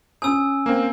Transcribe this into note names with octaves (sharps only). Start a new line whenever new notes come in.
C#4 G#5 D#6 E6
A#3 C4